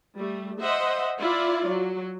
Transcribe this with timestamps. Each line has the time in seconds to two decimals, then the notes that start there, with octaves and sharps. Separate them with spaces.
0.17 G3 A3
0.60 C5 D#5 E5 F#5
1.19 E4 F4 D5
1.68 F#3